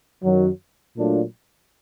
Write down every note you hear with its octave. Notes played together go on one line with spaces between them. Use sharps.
F#2 D#3 F#3
A#2 F#3 A3 D4 F4